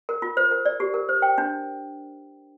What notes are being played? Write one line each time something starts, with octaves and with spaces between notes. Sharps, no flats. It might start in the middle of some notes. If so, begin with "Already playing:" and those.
A#4
F4
C5
A#4
D5
G4
A#4
C5
G5
D4